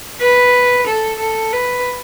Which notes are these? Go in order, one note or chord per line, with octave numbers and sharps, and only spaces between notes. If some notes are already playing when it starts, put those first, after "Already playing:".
B4
A4
A4
B4